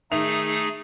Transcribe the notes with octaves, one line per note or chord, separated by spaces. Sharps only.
D#3 A3 D#4 G#4 E5 F7